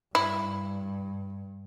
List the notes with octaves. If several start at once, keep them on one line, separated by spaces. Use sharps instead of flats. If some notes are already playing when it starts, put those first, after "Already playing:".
G2 E4